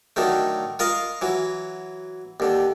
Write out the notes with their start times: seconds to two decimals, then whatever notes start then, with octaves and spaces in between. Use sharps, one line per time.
0.16 D3 D#3 F#3 A3
0.79 F4 A#4 D#5 F5
1.22 E3 F#3
2.40 D#2 D3